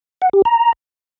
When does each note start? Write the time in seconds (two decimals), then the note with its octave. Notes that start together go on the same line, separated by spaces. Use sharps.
0.22 F#5
0.33 G4
0.45 A#5